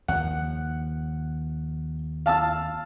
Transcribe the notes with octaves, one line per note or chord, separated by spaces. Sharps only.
D#2 F3 F#5
F5 A5 E6